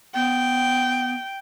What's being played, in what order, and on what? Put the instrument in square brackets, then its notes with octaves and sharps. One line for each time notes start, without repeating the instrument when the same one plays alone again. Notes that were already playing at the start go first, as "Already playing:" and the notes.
[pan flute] B3 [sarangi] G5